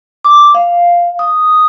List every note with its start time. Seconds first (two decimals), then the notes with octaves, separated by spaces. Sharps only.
0.25 D6
0.55 F5
1.19 D#6